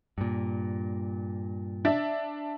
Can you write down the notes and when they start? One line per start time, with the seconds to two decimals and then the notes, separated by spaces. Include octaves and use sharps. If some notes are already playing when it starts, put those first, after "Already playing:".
0.18 G2 A#2
1.85 D4 E5 A6